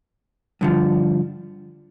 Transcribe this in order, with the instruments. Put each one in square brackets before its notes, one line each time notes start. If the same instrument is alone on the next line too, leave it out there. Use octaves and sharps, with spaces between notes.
[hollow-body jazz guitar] G2 D3 F3